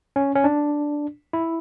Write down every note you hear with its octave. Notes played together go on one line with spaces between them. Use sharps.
C#4
C#4
D4
E4